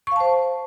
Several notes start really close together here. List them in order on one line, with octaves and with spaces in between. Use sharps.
C#6 F5 A5 C5